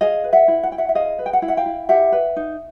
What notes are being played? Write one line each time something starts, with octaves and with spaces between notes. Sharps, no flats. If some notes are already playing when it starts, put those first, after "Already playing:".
G#4 D#5 F5
B4
E5 F#5
E4
F#5
E4 G5
E5 F#5
E5
G#4 D#5 F5
B4
G5
F#5
E4 F5
E5 F#5
F5 G5
E4
G4 E5 F#5
B4
D#4